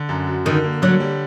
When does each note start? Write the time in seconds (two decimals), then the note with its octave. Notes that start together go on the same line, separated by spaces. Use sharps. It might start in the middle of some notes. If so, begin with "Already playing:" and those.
Already playing: D3
0.09 F#2
0.27 F#3
0.46 D3 D#3
0.64 A#3
0.82 D3 F#3
1.00 G3